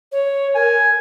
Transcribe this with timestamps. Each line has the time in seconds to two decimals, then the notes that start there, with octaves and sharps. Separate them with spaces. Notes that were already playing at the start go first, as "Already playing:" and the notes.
0.12 C#5
0.55 A#4 G#5